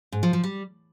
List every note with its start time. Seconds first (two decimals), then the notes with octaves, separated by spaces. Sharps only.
0.12 G#2
0.23 F3
0.33 F3
0.44 G3